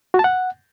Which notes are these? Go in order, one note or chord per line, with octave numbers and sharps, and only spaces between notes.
F#4
A5
F#5